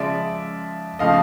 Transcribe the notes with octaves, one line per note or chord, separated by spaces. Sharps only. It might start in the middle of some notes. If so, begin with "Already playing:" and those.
Already playing: C#3 F3 G#3 D5 E5
C#3 F3 A3 D#5 F5